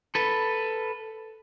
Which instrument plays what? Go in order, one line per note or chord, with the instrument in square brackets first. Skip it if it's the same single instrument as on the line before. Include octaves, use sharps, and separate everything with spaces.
[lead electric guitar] A4 B4